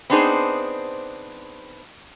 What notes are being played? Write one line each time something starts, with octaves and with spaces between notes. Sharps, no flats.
B3 C4 D4 D#4 G#4 C5